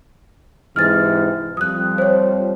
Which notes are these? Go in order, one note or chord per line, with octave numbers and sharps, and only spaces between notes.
G#2 C3 E3 F6 A6
F2 F3 G3 D#6 F#6
C5 C#5